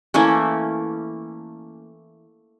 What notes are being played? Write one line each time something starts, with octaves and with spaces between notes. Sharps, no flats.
E3 A3 A#3 C#4